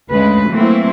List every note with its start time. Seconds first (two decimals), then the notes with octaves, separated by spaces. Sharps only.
0.10 D2 C#3 G#3 B4
0.49 E3 F#3 A3 A#3 C4 E4